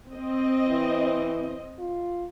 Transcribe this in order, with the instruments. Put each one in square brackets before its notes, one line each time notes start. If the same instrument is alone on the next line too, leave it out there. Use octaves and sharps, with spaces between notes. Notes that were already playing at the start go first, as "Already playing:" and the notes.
[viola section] C4 D#5
[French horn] E3
F4